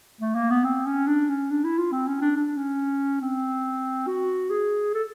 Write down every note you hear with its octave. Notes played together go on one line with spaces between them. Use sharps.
A3
A#3
B3
C4
C#4
D4
C#4
D4
E4
F4
C4
C#4
D4
D4
C#4
C4
F#4
G#4
A4